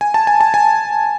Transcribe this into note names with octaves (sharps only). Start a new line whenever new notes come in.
G#5
A5
G#5
A5
G#5